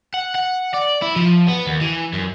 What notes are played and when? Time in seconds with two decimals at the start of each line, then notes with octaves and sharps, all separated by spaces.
0.14 F#5
0.35 F#5
0.74 D5
1.02 E4
1.16 F3
1.48 B3
1.67 D#2
1.81 E3
2.13 F#2